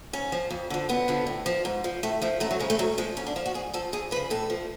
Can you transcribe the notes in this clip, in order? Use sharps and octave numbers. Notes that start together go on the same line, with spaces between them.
G#2 C#4
F3
F2
D3 F3
F#2 B3
D3 F3
A2
F3
G#2
F3
A2 A3
F3 A3
F#2 A3
F#3
C#3 F3 G#3
A3
G#2 F#3
F3 G#3
G#2 C#4
D4
F3 F4
F#4
G#2 G#4
F3 A4
F2 G#4
C#3 F3 B4
A2 A4
F3